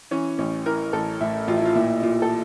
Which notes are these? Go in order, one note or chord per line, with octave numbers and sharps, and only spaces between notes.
E3 C#4
A1 C#4
E3 A#4
A1 A4
A2 E4
A1 F4
E4
F4
A#2 E4
A#2 F4
A4